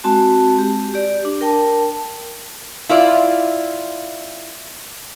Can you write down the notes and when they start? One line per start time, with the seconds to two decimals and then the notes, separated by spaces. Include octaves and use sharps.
0.04 G#3 C4 F#4 A5
0.58 G4
0.94 G4 D5
1.25 D4
1.41 A#4 G5 A5
2.89 E4 F4 D5